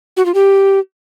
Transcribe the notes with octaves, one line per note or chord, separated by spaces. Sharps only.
F#4
F4
G4